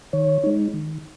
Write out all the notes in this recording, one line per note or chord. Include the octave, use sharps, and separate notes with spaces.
D#3 C#5
G#3 D#4
D#3